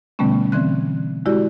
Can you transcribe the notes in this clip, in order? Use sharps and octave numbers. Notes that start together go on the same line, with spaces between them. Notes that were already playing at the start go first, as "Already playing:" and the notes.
B2 D3 G3 A3 B3 C#4
D3 E3 C4 F#6
G#3 E4 F#4 G4 D5